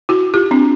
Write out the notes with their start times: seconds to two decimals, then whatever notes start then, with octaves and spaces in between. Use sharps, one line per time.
0.09 E4 F#4
0.34 F4 G4
0.51 C4 D4